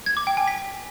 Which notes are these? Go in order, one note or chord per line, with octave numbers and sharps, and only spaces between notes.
G#6
D6
G5
G#5
B6